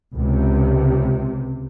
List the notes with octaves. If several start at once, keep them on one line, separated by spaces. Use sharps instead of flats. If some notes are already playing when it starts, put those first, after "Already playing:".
C#2 C3